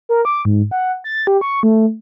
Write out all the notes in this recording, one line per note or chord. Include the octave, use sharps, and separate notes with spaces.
A#4
D6
G#2
F#5
A6
G4
C#6
A3